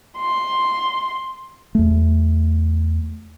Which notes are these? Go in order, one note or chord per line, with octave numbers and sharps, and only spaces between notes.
C6
E2 A3